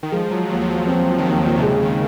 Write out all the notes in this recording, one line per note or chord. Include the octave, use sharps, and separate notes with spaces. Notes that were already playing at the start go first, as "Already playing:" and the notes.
D#3
F3 G#3
F#3
D#2 F#3
F3
F#3
F3 C4
D#3
D#2 F3
A#2
C3 G#3
C#3
D#3